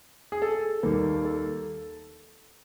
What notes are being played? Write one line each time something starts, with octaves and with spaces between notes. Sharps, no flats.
G#4
A4
D#2 D#3 G3 A#3
A4